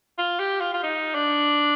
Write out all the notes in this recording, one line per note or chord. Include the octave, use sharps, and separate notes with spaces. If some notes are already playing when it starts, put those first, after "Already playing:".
F4
G4
F4
F4
D#4
D4